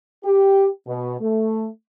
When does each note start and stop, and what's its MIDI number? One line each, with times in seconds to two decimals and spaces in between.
0.25 0.68 67
0.87 1.17 47
1.21 1.67 57